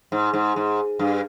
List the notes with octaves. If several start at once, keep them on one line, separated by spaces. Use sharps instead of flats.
G#2
G#2
G#2
G2